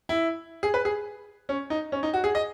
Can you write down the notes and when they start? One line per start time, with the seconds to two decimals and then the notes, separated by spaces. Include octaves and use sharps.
0.09 E4
0.63 G#4
0.74 B4
0.85 G#4
1.49 C#4
1.70 D#4
1.92 C#4
2.03 D#4
2.13 F#4
2.24 G#4
2.35 D#5